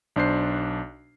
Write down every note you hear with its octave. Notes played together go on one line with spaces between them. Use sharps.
B1 D4 C5 C7